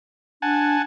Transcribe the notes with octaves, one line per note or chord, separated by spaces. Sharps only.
D4 F#5 G#5 A5